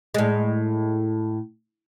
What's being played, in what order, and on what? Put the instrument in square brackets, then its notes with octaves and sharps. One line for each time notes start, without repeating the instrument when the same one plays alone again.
[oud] A2 G#3